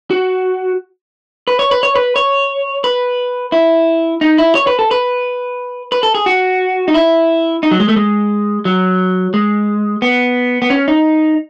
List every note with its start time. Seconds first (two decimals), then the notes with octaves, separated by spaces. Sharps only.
0.11 F#4
1.48 B4
1.59 C#5
1.71 B4
1.83 C#5
1.96 B4
2.16 C#5
2.84 B4
3.52 E4
4.21 D#4
4.38 E4
4.55 C#5
4.67 B4
4.79 A4
4.91 B4
5.92 B4
6.03 A4
6.15 G#4
6.26 F#4
6.88 D#4
6.94 E4
7.63 D#4
7.71 F#3
7.80 G#3
7.89 A3
7.96 G#3
8.65 F#3
9.34 G#3
10.02 B3
10.62 B3
10.70 C#4
10.88 D#4